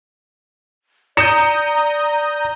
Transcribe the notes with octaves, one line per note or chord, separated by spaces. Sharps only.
D5 A#5 D#6 G6 C#7 E7